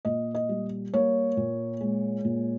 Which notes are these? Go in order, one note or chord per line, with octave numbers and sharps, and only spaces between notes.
A#2 D#5
D#5
G3
A#3 C#5
A#2
G#3
A#2